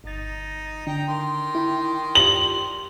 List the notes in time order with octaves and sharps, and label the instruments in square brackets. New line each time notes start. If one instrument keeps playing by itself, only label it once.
[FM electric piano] G1 A6 [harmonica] D#4
[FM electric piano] D3 D4 [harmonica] G5 A#5
[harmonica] D#3 C6
[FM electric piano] E4 G5 B5
[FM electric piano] F4 G4 D5 [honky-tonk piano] F#7